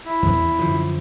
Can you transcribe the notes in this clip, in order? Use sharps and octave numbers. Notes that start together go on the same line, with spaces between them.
E4
E2
F#2 D3 F3